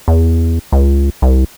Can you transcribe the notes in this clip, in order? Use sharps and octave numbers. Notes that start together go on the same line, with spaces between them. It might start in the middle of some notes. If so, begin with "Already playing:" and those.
E2
C#2
C2